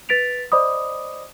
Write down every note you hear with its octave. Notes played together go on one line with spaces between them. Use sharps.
B4 A6 B6 D7 F7
C5 D5 D#5 B5 D6 D#6